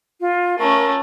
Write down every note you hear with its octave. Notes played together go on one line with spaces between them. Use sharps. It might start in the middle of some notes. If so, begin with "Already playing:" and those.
F4
A3 C#4 A#4